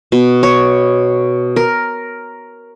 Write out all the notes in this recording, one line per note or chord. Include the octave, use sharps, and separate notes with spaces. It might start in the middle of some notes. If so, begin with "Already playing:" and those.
B2
C#5
A#4